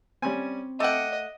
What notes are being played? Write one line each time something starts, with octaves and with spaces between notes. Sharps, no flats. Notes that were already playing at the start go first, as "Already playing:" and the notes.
G3 C4 C#4 G#5
A3 D#5 F#5 G5 D6